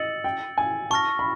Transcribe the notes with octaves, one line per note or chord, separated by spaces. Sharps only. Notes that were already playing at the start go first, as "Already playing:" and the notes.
Already playing: D#5 E6 A6 C#7 F#7
G5
G#5
A5 C#6 F6 A#6
B5